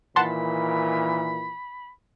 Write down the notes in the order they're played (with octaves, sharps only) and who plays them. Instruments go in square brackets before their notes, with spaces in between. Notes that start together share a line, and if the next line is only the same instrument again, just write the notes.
[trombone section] A#2 D#3 E3 [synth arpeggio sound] F#5 A5 C6 [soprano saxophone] B5